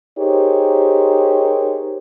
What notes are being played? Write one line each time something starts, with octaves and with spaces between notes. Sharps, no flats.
D#4 G4 G#4 A#4 C5 C#5